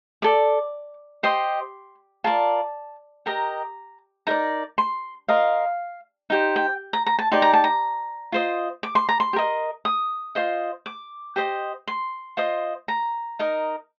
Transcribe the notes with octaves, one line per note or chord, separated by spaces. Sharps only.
A4 D5 D6
G4 C5 D#5 C6
F4 A#4 D5 A5
G4 A#4 D#5 A#5
D#4 A#4 D5 A#5
C6
F4 A#4 D#5 F5
D#4 G4 C5
G5
A#5
A#5
A5
D#4 G4 D5 C6
A#5
A5
A#5
F4 C5 D#5
D6
C6
A#5
C6
G4
A#4 D#5
D#6
F4 C5 D#5
D6
G4 C5 D#5
C6
F4 C5 D#5
A#5
D#4 A#4 D#5